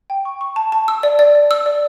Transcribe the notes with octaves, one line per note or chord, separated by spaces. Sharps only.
G5
C#6
C#6
A5
A5
E6
D5
D5
D5
E6
D5